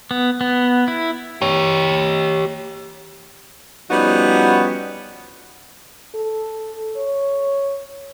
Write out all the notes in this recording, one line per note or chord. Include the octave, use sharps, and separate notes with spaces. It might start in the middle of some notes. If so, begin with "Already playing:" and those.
B3
B3
E4
G4 C#5
F3 G3 B3 C#4 D#4 F#4
A4
C#5